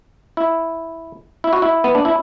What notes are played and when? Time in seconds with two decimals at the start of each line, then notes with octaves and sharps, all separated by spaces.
0.37 E4
1.44 E4
1.53 F#4
1.62 E4
1.84 B3
1.95 D4
2.05 E4